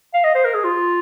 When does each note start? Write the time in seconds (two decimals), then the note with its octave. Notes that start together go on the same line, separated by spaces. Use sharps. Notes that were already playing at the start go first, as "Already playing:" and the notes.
0.14 F5
0.24 D#5
0.35 C5
0.45 A#4
0.54 G#4
0.64 F4